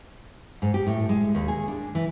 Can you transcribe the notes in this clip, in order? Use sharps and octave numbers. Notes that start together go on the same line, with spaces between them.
G#2
G4
A2
G#3
D#2
G#4
D4
E3